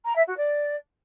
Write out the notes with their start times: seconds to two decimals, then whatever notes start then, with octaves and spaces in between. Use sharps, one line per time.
0.05 A#5
0.16 E5
0.26 F#4
0.37 D5